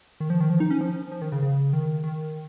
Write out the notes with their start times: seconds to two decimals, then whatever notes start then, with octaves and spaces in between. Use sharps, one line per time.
0.20 D#3
0.30 F3
0.40 D#3
0.50 F3
0.60 D#4
0.71 C#4
0.81 F3
1.12 F3
1.22 D#3
1.32 C#3
1.42 C#3
1.73 D#3
2.04 D#3